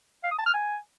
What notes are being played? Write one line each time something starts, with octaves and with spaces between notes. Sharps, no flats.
F5
D#6
A5
F6
G#5